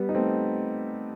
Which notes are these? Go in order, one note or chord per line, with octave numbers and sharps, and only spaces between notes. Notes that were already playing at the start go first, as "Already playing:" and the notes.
Already playing: G3 B3
D#4
A3 C4